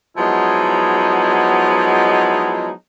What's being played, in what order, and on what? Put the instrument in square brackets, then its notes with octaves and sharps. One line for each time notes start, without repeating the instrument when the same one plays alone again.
[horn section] F3 F#3 G#3 B3 D#4 E4